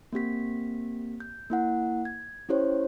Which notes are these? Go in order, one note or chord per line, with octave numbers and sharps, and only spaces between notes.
A#3 C4 G4 B6
G6
A#3 E4 F#5
G#6
C#4 E4 G4 C5 C#5